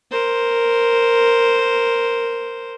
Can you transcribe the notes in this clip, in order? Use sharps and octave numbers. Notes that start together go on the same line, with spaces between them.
A#4 C5